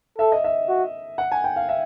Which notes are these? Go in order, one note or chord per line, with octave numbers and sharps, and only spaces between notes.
A4 E5
D#5
E5
F#4
F#5
G#5
G5
F5
E5